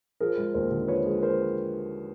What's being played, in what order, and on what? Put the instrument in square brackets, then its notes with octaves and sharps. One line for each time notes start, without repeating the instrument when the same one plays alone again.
[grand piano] F3 G#4 A#4
G#3
D#2 A#4 C5
D3
F3 B4 C#5
G#3
A#4 C5